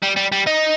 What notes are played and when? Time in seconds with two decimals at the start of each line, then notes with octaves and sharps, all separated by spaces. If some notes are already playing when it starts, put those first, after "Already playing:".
0.03 G3
0.17 G3
0.32 G3
0.47 D#4